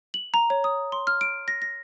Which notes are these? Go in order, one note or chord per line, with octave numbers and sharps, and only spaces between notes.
F#7
A#5
C#5
D#6
C6
F6
D7
A#6
A#6